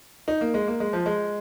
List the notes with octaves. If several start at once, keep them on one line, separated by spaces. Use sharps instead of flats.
D#4
A#3
G#3
A#3
G#3
F3
G#3